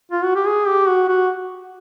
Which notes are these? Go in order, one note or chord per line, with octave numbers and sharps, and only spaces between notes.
F4
F#4
G4
G#4
G4
F#4
F#4